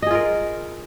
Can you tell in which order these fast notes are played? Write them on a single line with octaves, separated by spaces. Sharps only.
D#5 G#4 F4 A#4